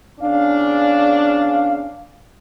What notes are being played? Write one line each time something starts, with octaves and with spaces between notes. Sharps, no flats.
E2 C#4 D4 F5